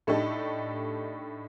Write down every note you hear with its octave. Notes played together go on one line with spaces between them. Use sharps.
A2 A3 D4 D#4 G4 A4